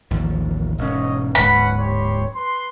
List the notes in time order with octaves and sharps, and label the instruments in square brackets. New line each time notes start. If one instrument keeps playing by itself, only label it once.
[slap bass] A1 D#2 F3
[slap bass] E1 G#2 C#4 [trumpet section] C#5 D#5
[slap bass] D1 G#2 [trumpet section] C#4 B4 F#5 [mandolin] B5
[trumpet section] G4 C#5 C6
B4 C6